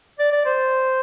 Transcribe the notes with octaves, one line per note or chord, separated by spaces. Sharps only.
D5
D5
C5